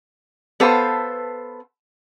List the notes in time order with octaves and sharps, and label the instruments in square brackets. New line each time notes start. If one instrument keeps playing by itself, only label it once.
[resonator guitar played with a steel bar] B3 A4 B4 C5 F5